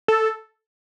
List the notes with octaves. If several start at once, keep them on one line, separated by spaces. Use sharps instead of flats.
A4